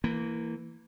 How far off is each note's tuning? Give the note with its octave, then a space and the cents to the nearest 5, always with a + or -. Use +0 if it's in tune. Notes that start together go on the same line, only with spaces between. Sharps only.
E3 +0 A#3 -20